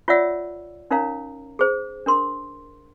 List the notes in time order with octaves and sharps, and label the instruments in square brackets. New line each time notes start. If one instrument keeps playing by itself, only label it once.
[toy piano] F4 C#5 D5 E5 F#5 E6
C#4 D#4 A#4 C#5 F5 A#5
G#4 C5
D4 A#4 C6